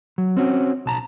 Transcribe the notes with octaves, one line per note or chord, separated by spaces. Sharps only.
F#3
C4 C#4 F#4
B1 A5 A#5